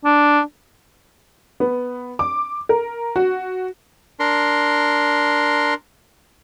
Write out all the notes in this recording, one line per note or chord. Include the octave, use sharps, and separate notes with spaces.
D4
B3
D6
A#4
F#4
D4 A#4 C6